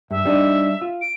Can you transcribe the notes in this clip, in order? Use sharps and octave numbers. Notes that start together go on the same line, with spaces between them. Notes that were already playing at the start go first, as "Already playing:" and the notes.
G2 E5
G3 D4 D#4
F4
D7